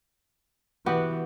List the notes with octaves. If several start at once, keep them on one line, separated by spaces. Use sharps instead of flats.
E3 B3 F#4 G4